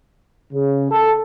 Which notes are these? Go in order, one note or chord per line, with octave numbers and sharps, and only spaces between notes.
C#3
A4